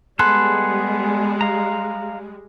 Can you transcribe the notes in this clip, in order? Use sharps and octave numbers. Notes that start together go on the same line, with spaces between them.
G3 G#3 B3 G#4 A4 B5 C6 F#6
F5 A#5